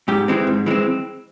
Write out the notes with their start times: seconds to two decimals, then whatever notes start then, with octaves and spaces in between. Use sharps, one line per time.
0.08 G#2 G4
0.28 E3 G#3 C4
0.47 G#2
0.66 E3 G#3 C4